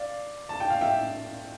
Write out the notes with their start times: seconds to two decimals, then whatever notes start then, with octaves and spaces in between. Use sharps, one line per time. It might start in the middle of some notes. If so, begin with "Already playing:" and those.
Already playing: D5 F5
0.49 A5
0.60 G5
0.70 F5
0.81 E5 G5